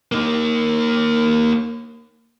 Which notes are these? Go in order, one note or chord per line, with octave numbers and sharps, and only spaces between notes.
A#3 D#4